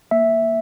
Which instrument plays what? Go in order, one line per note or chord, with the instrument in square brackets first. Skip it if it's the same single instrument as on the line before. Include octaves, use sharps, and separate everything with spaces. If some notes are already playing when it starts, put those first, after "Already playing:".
[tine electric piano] A#3 E5